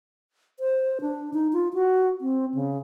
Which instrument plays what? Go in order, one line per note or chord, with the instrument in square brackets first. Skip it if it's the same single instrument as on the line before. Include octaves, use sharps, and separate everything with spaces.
[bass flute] C5
D4
D#4
F4
F#4
C4
C#3